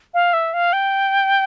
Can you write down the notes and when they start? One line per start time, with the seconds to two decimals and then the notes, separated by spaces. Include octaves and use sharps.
0.14 F5
0.33 E5
0.54 F5
0.73 G5